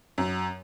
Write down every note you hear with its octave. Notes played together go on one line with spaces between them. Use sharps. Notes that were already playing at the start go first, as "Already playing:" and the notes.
F#2